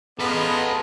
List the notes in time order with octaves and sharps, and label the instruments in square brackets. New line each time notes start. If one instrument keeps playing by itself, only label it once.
[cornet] B3 [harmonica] F4 D#5 [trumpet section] G#4 [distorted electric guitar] A4 B4